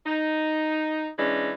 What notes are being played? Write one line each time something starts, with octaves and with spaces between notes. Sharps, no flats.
D#4
E3 G#3 C#4 D4